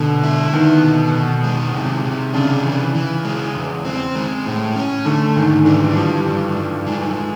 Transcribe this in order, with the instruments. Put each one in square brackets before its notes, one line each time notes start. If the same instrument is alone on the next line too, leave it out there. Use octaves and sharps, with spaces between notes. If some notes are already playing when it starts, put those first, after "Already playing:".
Already playing: [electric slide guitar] B2 [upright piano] D3
[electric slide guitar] E4
[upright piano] D#3 [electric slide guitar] B3
[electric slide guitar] B2
B2
G#3
C3
C3
[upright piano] C#3 [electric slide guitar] D4
[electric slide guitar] E3
E3
G#3
E2
C4
G#3
A2
C#4
[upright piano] D3 [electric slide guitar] A3
[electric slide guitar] G#2 [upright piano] D#3
[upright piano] E3 [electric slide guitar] D4
[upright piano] F3 [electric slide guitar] G3
[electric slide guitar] G2
G2
G#3